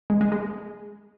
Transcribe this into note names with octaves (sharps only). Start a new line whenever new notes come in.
G#3
G#3
G#3